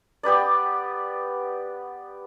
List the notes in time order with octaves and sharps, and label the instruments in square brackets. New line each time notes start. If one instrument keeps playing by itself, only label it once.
[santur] B3 G4 B4 D5